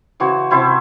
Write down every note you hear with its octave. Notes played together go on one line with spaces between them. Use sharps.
C#3 E3 F#4 C5
C3 E4 C5 A5